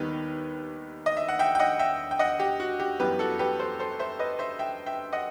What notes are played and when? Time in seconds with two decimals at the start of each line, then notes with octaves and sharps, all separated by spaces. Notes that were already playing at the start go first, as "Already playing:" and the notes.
Already playing: D#2 D#3 G3 B3 D#4 G4 B4
1.06 D#5
1.17 E5
1.28 F#5
1.39 E5 G5
1.55 G5
1.59 D#5 F#5
1.79 E5 G5
2.11 G5
2.19 D#5 F#5
2.40 G4
2.60 F#4
2.80 G4
2.99 F#2 E3 G3 B3 G4 B4
3.19 F#4 A4
3.39 G4 B4
3.59 A4 C5
3.79 A4 C5
3.99 C5 E5
4.19 B4 D#5
4.39 C5 E5
4.59 E5 G5
4.86 E5 G5
5.13 D#5 F#5